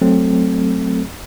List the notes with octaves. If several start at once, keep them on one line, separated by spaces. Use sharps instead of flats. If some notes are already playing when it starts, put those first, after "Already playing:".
F#3 A3 C4 A4